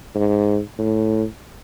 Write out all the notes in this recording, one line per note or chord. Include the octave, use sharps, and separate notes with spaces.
G#2
A2